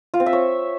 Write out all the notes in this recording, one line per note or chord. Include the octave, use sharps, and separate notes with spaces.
F4
C4
E5
C#5